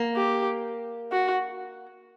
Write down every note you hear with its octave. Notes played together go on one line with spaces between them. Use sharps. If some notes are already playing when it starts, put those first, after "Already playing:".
Already playing: A#3
G4
F#4